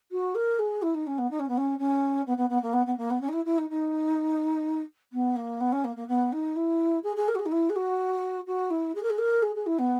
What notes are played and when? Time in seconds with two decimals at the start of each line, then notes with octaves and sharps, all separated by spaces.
0.11 F#4
0.35 A#4
0.59 G#4
0.82 E4
0.94 D#4
1.06 C#4
1.18 B3
1.30 D#4
1.39 C#4
1.48 B3
1.57 C#4
1.78 C#4
2.26 B3
2.37 B3
2.49 B3
2.62 A#3
2.73 B3
2.86 B3
2.97 A#3
3.10 B3
3.21 C#4
3.28 D#4
3.33 E4
3.45 E4
3.58 D#4
3.69 D#4
5.12 B3
5.36 A#3
5.60 B3
5.72 C#4
5.84 A#3
5.96 A#3
6.08 B3
6.32 D#4
6.56 E4
7.03 G#4
7.16 G#4
7.28 A#4
7.35 F#4
7.39 G#4
7.45 D#4
7.51 E4
7.69 G#4
7.75 F#4
8.47 F#4
8.70 E4
8.95 G#4
9.02 A#4
9.10 G#4
9.18 A#4
9.42 G#4
9.55 G#4
9.66 E4
9.78 B3